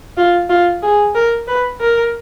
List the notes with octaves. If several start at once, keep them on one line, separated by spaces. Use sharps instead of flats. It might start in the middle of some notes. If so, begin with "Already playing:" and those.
F4
F4
G#4
A#4
B4
A#4